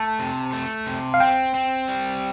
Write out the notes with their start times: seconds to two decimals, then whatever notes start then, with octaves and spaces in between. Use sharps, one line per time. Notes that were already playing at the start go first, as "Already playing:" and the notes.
Already playing: A3 A5
0.19 C3
0.53 A3
0.86 C3
1.14 F5
1.20 C4 G5
1.55 C4
1.88 G3